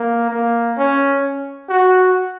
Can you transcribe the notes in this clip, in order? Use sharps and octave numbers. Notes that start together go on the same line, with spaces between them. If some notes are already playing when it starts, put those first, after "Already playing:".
Already playing: A#3
A#3
C#4
F#4